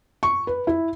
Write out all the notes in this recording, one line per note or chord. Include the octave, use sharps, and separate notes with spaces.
C#6
B4
E4